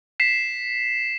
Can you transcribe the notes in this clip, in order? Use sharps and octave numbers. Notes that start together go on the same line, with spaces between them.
B6 C7 E7